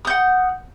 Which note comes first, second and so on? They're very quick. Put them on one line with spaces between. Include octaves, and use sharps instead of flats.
D#6 G6 F#5